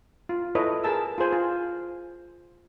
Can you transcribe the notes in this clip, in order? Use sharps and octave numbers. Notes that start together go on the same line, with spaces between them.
F4
E4 A4 B4 C#5 D#5
G#4 A#4 A5 E6
F4 G#4 C5 G#5
F4